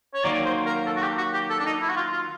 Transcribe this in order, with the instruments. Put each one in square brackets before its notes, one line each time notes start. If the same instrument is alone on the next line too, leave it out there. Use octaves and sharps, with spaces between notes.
[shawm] C#5
[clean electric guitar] D#3 F#3 A#3 [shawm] D5
[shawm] C5
A#4
A4
F#4
G4
F#4
G4
A4
D4
D#4
E4
F#4
F4
F4